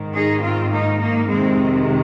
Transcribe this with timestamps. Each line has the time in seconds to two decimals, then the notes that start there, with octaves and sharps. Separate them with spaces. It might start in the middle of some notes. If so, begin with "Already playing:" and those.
Already playing: G#2 D#3
0.14 D#4 G#4
0.42 C4 F4
0.71 A#3 D#4
1.00 A#3 D#4
1.28 F2 C3 D#3 G#3 C4
1.72 G#3